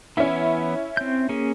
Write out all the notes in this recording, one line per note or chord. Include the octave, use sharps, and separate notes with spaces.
E3 B3 C#4 E4 E5
C4 G6
A#3 C#4 G#4